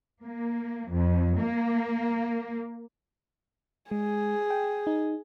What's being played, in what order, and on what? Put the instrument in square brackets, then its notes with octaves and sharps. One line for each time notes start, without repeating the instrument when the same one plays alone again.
[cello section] A#3
F2
A#3
[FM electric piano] G#3 [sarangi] G#4
[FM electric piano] G5
D#4